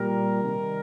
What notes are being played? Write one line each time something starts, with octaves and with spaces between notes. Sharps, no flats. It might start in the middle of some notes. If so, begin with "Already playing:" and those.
Already playing: A#2 G3 A#4
C3 D#3 G3